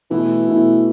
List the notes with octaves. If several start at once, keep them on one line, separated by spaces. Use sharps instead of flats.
B2 E3 A3 E4
B2 A3 E4